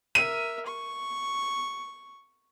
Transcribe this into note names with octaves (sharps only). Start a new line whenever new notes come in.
A#4 E5 D#7
C#6